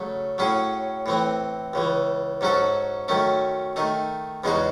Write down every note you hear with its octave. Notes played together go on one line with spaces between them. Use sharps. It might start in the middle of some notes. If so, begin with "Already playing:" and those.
Already playing: C#3 F#3 A3
A2 F#3 C#4 G#4
A2 E3 C4
C#2 C#3 E3
G#2 F#3 C#4 F#4 A4
F#2 D#3 A3 C#4
D#3 A3 D#4
E2 C#3 G#3 D#4 F#4